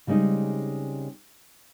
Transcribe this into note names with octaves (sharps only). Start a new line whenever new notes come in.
C#3 G3 G#3 C4 D#4